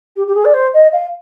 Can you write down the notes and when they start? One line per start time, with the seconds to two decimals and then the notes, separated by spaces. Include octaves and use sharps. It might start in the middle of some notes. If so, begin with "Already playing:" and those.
0.16 G4
0.27 G4
0.35 G#4
0.45 D5
0.54 C5
0.74 D#5
0.92 F5